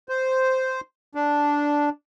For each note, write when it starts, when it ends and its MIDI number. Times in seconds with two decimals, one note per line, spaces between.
0.09 0.81 72
1.15 1.89 62